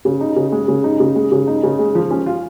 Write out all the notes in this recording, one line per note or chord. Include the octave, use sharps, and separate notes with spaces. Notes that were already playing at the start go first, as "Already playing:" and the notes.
C#3
D#4
C#3
G#3
C#3
D#4
C#3
G#3
C#3
D#4
C#3
G#3
F3
C#4
F4